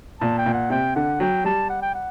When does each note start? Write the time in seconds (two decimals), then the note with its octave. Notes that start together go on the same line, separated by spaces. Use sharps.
0.20 A#2 A5
0.38 G5
0.46 A#2
0.54 F#5
0.70 C3 G5
0.96 D3 F#5
1.20 F#3 G5
1.44 G3 A5
1.70 F#5
1.82 G5
1.95 F#5